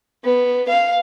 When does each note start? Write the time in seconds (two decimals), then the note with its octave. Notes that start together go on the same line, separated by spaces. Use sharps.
0.24 B3
0.69 F5